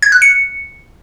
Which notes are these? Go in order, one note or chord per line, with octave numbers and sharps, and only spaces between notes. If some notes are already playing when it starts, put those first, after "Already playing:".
G#6
F#6
C#7